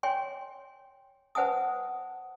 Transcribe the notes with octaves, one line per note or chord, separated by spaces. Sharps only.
C#5 G5 G#5 C6
B4 C5 F#5 G#5 A5 D#6